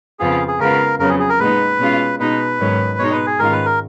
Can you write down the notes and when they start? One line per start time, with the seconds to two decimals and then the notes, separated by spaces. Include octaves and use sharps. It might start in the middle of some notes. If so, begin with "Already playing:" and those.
0.20 F2 C#3 F3 B3 F4 G#4
0.48 G#4
0.59 C#3 G#3 B3 F4 A#4
0.99 F2 C#3 F#3 B3 A#4
1.09 G#4
1.19 G#4
1.29 A#4
1.39 A#2 G#3 B3 D#4 B4
1.79 B2 G#3 C#4 F4
2.20 B2 G#3 D#4 B4
2.59 G#2 D#3 F#3 C#4
2.99 B2 G#3 D#4 C#5
3.12 B4
3.26 G#4
3.39 G#2 D#3 G#3 C#4 F4 A#4
3.52 B4
3.65 A#4